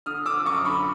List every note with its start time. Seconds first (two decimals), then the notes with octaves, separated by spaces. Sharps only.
0.06 D3 D#6 F6
0.26 D3 D6 E6
0.45 F#2 C#6 D#6
0.65 D3 B5 C#6